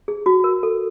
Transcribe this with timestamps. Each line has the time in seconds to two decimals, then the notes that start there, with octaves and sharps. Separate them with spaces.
0.08 G#4
0.26 F#4
0.44 A#4
0.63 A4